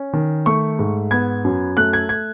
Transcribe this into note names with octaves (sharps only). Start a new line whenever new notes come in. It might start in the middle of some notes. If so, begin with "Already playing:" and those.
Already playing: C#4
D#3
A3 C#6
G#2
B3 G#6
F#2
A3 F#6
G#6
G#6